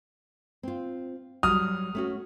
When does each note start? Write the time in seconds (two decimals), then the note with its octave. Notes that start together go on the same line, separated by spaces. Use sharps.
0.63 C4 F4
1.43 F#3 G3 D#6 F6
1.95 A3 C#4 F#4